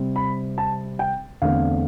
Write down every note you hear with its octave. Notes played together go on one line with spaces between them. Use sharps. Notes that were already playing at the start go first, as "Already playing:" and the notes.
Already playing: C3 G3 C4
B5
A5
G5
E2 D3 A3 C4 F5